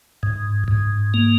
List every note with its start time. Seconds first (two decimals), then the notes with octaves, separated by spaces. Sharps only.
0.23 G#2
0.68 G#2
1.14 A#3